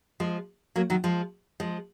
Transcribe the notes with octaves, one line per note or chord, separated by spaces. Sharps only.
F3 G#3
F#3 A#3
D#3 F#3
F3 G#3
F3 G#3